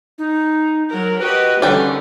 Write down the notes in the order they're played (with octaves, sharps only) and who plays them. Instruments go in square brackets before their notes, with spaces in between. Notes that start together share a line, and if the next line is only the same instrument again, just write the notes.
[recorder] D#4
[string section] F#3 A#4
[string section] F#4 G4 D#5 [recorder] B4
[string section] D3 D#3 C#4 [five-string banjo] G3 G5